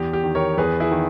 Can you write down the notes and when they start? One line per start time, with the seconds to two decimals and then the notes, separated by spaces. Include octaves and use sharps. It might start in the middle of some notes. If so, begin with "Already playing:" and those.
Already playing: E2 G4
0.13 G4
0.24 D#3
0.35 A#4 C#5
0.58 E2 G#4 B4
0.80 E4 G#4
0.91 D#3